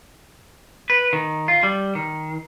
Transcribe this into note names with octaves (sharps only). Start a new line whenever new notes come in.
B4
D#3
F4
G3
D#3